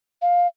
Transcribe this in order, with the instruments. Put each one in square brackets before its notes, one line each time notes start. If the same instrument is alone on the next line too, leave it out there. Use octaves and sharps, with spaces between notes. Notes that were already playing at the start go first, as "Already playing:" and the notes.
[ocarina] F5